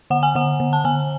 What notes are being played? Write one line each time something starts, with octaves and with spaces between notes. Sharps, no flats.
D3 F#5
G#5
D3 F#5
D3
A5
D3 G#5